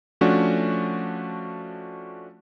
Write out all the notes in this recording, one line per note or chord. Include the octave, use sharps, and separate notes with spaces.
F3 A3 C#4 D4 F#4